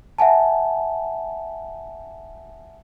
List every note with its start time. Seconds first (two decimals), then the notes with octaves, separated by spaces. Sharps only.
0.18 E5 F#5 G#5 A5